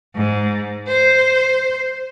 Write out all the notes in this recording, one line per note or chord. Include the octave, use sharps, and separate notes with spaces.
G#2
C5